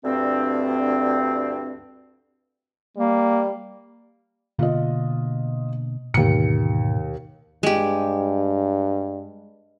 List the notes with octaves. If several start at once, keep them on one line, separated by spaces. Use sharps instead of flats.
D2 G2 C4
G3 A#3
B2 D3 A#3 F4 D#5
D#2 G#2 B2 D3 C#7
G2 G#3 G4